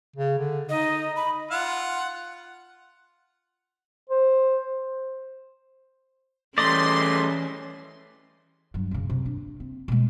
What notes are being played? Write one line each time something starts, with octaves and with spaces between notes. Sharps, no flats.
C#3
D3
D#4 D#5
B5
F4 F#5
C5
E3 G3 A3 C#4 D5 D#5 C6
G2 F#3
F#2 C#3
C3
D4
C4
B2 G#3